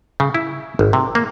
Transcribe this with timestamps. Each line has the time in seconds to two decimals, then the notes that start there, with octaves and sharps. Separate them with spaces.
0.20 C#3
0.35 E4
0.79 G#1
0.93 C3
1.15 A#3